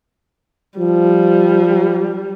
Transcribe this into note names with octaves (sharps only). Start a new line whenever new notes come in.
F3 G3